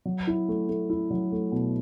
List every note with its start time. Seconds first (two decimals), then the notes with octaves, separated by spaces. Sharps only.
0.05 F#3
0.27 E4
0.48 A3
0.69 A3
0.90 E4
1.10 F#3
1.32 A3
1.52 B2